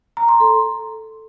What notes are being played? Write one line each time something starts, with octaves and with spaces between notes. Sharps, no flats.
A#5
C6
A4